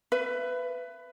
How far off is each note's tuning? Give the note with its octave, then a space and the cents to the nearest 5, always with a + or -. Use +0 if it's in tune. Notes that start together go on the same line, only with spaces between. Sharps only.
B4 +15 E5 +40